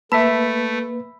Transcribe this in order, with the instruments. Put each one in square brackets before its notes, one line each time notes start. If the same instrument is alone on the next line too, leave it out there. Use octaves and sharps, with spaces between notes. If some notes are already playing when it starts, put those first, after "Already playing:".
[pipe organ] A3 [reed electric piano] A#3 B4 [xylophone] E5 A5 [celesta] B5 E6 B6